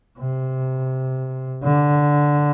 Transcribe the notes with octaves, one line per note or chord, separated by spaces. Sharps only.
C3
D3